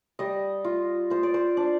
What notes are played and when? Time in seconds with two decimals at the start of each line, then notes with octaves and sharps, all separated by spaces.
0.19 G3 D#5
0.64 F4
1.10 F4 C5
1.23 D5
1.34 C5
1.57 D4